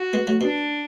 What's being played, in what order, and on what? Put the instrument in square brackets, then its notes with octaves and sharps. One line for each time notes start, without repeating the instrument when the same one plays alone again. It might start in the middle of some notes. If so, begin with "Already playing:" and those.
Already playing: [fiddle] F#4
[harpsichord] G#3 B3
F#3 A3
[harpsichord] B2 [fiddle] D4